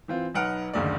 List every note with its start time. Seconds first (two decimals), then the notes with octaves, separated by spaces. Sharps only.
0.08 E3 C4 F4
0.34 B1 D#4 B4 F#5 F6 D7
0.73 F#1 D2 D#3 A#3 D#4 D5